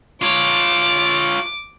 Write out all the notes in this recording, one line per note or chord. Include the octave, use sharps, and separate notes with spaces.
F4 C#5 D6